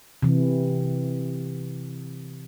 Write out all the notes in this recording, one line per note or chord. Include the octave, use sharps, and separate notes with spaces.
C3 E3